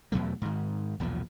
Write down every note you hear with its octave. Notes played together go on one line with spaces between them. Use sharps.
E2 B2 F#3 A3
G#2 D#3
B1 E2 A#2 F3